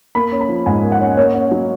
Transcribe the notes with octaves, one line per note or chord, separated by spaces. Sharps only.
A#3 B5
C#4
B5
F3
G#2 G#5
A#3
F#5
C#4
A#3 C#5
C#4
F#3